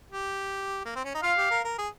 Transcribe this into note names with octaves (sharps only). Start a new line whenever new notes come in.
G4
A#3
C4
C#4
D#4
F4 F5
G4
A#4
A#4
G#4